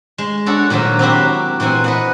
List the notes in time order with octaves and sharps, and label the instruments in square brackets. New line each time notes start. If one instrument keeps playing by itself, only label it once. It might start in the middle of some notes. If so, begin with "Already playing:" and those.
[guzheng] G#3
D4 F#4 A4 C#5
A#2 D#3 F3 F#3 A#3
F#3 C4 D4 E4 F#4 G4
A#2 E3 C4 F#5 G#5
B4 D#5 F#5